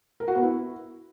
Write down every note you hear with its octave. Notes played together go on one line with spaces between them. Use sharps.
A#4
F#4
B3
E4